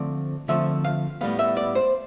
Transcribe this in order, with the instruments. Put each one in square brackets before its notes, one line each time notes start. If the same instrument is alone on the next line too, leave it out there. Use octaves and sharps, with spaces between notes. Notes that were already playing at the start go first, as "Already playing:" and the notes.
Already playing: [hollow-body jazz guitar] D3 F3 A3 C4 D5
D3 F3 A3 C4 E5
F5
A2 G3 B3 F5
E5
D5
C5